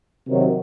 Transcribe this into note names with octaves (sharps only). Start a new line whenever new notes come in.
C3 D#3 F#3